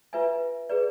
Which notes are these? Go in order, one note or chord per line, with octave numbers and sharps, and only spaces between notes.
F4 B4 E5 G#5
G#4 B4 D5